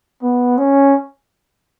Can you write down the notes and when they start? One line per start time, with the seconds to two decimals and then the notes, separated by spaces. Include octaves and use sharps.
0.22 B3
0.57 C#4